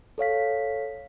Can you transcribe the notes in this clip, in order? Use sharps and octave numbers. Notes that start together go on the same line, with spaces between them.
A4 C#5 F5 B6